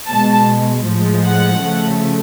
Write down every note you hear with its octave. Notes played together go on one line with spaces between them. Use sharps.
B2 G#3 A5
A2 F3 G#3
F#5
C#3 F3 A3